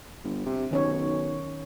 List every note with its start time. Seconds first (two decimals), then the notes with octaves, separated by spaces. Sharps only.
0.24 G1
0.46 C3
0.71 B1 D#3 C#4 C#5